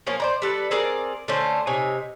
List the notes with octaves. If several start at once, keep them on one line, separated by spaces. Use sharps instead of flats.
F3 A#3 C#4 C#5
C5 D5 A#5
G3 A4 B4
C4 G#4 A#4 D5
D3 A3 C#4 C5
C3 D#4 C#5 G#5